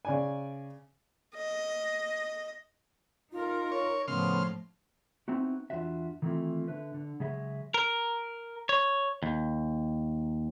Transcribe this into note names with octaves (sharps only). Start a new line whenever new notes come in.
C#3 D5 G#5
D#5
D#4 F4 A#4
C#5
A2 C#3 F3 B3 C6 F6
B3 C4 D#4 E4 F#4
E2 D4 F4 F#4 E5
D#3 E3 A3 C4 E4 F4
D3 B4 E5
D3
C#3 F#3 G#3 G#4 E5
A#4
C#5
D#2